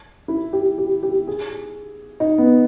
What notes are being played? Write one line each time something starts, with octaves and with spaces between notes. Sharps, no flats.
E4
G4
G4
G4
G#4
D#4
B3